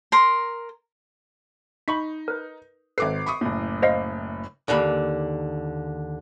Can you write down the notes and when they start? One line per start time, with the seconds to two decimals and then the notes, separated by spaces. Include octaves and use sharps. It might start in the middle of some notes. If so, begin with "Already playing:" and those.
0.12 A#4 C6
1.88 D#4 B5 C#6 B6
2.28 A#4 B4
2.98 G#1 A4 B4 D6 C7
3.26 B5 C#6 D#6
3.41 F#1 A2
3.82 C5 D#5 F5
4.68 D#2 D3 A#3 B5